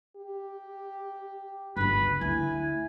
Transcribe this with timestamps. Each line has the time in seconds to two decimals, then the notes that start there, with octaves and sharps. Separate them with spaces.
0.16 G4
1.77 G1 C#2 B4
2.21 D2 E4 G#5